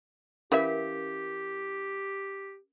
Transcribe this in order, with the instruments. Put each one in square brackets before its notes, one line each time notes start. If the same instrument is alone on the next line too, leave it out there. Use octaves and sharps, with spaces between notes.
[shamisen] E3 E5 [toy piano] C#4 A#4 F5 [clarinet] G4